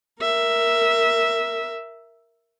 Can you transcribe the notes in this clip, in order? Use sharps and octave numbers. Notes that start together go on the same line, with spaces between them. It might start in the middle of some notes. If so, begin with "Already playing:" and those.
A#4 E5